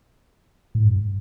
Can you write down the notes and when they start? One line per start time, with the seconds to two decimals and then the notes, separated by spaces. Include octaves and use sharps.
0.75 A2
0.85 G2